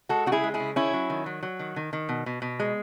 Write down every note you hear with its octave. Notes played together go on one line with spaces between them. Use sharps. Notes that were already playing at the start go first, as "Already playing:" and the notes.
G#3 F#4 A4
C#3 F#4
E4 G#4
G#3
E4 G#4
C#3
D#3 C#4 E4
F#3
D#3
F#3
F#3
D#3
D#3
D#3
B2
B2
B2
G#3